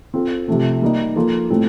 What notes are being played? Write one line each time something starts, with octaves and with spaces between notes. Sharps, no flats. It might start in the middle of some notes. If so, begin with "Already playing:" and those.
C4 F4 A4
C3 F3 A3 C4
G3 A#3 D#4
F3 A#3 F4 A4
A2 G3 C4 F4 A4